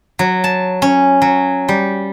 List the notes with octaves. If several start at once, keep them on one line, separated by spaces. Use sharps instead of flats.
F#3
A5
C#4
F#3
G3